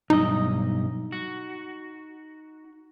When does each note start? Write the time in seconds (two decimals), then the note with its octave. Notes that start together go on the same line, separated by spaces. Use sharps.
0.10 B1 G2 D#4 D#5
1.12 F#4